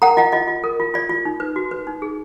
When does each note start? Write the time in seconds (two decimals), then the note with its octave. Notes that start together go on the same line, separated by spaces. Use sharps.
0.02 A#4 F#5 A#5
0.17 F4 D#5 F#5
0.32 F4 D#5
0.48 F4
0.64 A#4
0.80 F4
0.94 F4 D5
1.09 F4
1.25 D#4
1.40 B4
1.56 F#4
1.71 B4
1.87 D#4
2.02 G#4